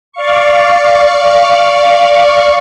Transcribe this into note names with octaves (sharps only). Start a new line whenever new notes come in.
D5 F5 C#6